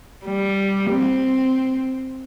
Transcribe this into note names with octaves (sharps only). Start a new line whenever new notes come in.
G3
C4